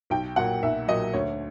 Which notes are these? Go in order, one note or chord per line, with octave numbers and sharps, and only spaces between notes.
B1 G5
A#2 F#3 F#5
B1 E5
A#2 F#3 D#5
D2 C#5